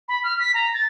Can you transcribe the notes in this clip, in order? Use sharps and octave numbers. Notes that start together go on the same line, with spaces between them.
B5
F6
B6
A#5
A6